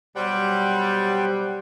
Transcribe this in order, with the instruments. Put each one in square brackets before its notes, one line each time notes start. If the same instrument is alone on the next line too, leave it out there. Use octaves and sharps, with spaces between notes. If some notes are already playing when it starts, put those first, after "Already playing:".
[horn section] B2 F#3 G3 [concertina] C5 F#5 G5